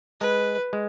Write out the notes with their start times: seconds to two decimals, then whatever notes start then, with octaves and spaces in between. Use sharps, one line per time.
0.20 G#3 B4
0.73 G#3